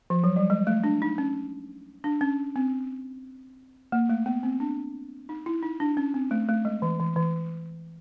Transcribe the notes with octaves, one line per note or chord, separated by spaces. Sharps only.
F3
F#3
G3
G#3
A3
D4
D#4
C#4
D4
C#4
C4
A#3
A3
B3
C4
D4
D#4
E4
D#4
D4
C#4
C4
A3
A3
G#3
E3
E3
E3